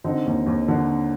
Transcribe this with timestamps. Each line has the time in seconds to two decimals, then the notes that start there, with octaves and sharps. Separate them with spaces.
0.04 D3 C4 D#4
0.26 D#2
0.46 D#2
0.68 D3